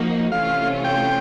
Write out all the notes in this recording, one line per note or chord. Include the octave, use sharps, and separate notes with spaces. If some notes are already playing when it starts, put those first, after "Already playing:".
Already playing: F3 A#3 D#4 F#4
C3 E3 A3 C#4 F4 F5
G5